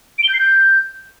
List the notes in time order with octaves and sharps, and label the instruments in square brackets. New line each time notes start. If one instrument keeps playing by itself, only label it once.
[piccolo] D7
G7
G6
C7
G6